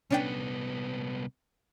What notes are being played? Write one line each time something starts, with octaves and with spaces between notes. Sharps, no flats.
C2 B3 C#4 D4 G5